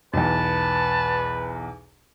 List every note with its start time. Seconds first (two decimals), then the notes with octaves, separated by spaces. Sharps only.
0.14 B1 E2 B4 A5